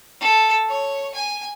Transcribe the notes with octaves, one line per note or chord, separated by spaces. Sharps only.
A4
C#5
G#5